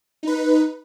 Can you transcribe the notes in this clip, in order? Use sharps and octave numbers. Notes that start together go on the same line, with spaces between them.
D#4 B4